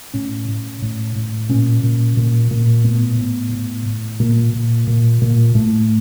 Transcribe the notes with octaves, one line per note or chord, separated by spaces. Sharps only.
A2 C#4
A2
A2
A2
A#2 C#4
A#2
A#2
A#2
A2 B3
A2
A2
A2
A#2 A#3
A#2
A#2
A#2
A2 A3